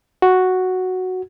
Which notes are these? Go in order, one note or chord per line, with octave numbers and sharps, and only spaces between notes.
F#4